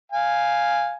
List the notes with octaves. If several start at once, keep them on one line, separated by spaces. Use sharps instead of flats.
F5 G#5